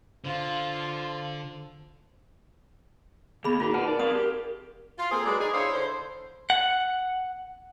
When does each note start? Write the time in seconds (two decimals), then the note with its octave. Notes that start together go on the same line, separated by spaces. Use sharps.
0.24 D3 F3 F4
3.44 D#2 B3 G#4 B5
3.60 A#2 D#4 F4 F#4 G#4 A#4
3.74 B4 F#5 A5
3.87 A#4 D5
4.00 C4 F5 D#6
4.15 G4
4.98 F4
5.12 A#3 C4 G#4 A4 C5
5.26 F#3 G#3 B4 D5
5.39 D#4 G#4
5.53 D4 E4 C5 C#5 F5
5.74 D3 C5
6.50 F#5